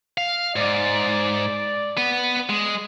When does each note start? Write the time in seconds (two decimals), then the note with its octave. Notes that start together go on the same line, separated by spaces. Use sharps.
0.18 F5
0.56 G#2 D5
1.97 B3 B4
2.49 G#3